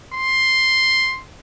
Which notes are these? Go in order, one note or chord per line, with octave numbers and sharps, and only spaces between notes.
C6